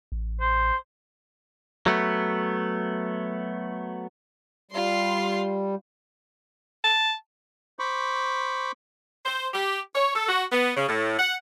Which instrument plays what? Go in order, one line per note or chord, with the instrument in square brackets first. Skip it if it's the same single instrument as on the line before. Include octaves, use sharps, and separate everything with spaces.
[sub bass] A1
[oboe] C5
[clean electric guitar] F#3 A3 B3
[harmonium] G3 [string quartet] F4 C6
[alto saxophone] A5
[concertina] C5 B5 C#6 D6
[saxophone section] C5
G4
C#5
A4
F#4
B3
C#3
A2
F#5